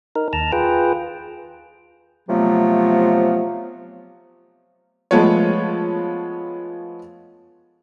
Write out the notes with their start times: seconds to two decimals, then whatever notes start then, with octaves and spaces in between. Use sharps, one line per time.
0.16 D#4 A#4
0.33 D#2 A5 A#5
0.52 F4 G#4 B4 G5
2.28 C3 F3 F#3 A3 B3
5.11 F3 G#3 A3 B3 F4 C#5